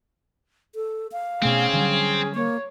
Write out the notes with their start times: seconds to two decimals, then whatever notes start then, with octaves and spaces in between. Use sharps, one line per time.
0.75 A4
1.12 F5
1.42 B2 A3 C4 C#4 G#4
1.73 D3 F#3 G3
2.35 A#3 C#5